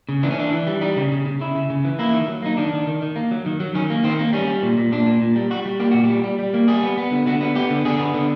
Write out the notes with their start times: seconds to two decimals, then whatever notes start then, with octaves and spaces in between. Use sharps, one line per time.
0.09 C#3
0.23 E3 D4
0.31 C#4
0.38 E3 D4
0.53 E3
0.67 G3
0.81 G3 D#4
0.97 C#3
1.12 C#3
1.26 C#3
1.40 C#3 E4
1.55 C#3
1.70 C#3
1.85 E3
1.99 A#3 E4
2.13 D#3
2.28 F#3
2.42 A#3 D#4
2.57 D#3 D4
2.73 D#3
2.87 D#3
3.02 D#3
3.16 A#3
3.31 F#3
3.46 D#3
3.60 F#3
3.75 D#3 C#4
3.90 A#3
4.04 D#3 C4
4.19 A#3
4.33 G3 C#4
4.48 G3
4.63 A#2
4.78 A#2
4.92 A#2 D4
5.06 A#2
5.22 A#2
5.36 G3
5.51 G3 F#4
5.65 G3
5.80 A#3 G4
5.91 A#2 F#4
6.04 G4
6.10 G3
6.24 G3
6.39 G3
6.54 A#3
6.68 G3 G#4
6.83 B3
6.98 B3
7.11 D3
7.27 D3 F#4
7.41 B3
7.55 B3 G4
7.70 D3
7.85 D3 G#4
8.00 B3
8.14 D3